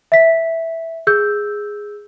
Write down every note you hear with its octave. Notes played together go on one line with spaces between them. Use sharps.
E5 B6
G#4 E6 G6